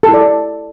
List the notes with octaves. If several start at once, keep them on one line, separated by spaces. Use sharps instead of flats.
A4
E4
D5